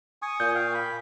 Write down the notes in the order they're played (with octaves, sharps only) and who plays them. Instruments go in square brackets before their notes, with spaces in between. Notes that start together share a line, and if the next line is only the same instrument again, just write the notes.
[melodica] G#5 C#6 D#6
[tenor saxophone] A#2 [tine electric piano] G6
[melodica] F5 G5
B5